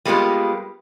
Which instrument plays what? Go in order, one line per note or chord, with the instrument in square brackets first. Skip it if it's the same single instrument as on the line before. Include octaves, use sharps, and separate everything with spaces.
[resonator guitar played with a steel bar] G3 G#3 A#3 B3 F4 G4